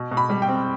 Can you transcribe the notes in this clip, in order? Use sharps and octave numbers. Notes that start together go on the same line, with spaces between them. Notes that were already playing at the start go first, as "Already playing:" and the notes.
Already playing: B2
B2
B5
G3
G5
C4